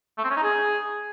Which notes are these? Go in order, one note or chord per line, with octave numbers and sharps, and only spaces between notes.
A3
C4
C#4
D#4
G#4